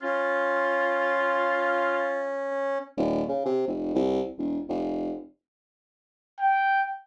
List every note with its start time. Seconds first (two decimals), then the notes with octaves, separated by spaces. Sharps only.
0.02 C#4 F4
2.97 D#1
3.28 C#3
3.46 C3
3.67 F1
3.95 C2
4.38 E1
4.68 F1
6.40 G5